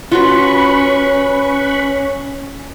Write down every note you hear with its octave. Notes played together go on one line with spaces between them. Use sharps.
C#4 F4 F#4 A#4 B4 B5 C#6